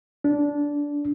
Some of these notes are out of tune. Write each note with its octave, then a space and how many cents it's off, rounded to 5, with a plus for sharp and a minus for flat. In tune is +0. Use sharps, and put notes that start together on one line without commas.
D4 -15